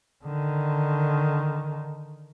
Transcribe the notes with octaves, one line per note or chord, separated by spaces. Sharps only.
D3 D#3